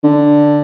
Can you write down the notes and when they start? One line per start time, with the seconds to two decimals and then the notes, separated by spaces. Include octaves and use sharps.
0.04 D3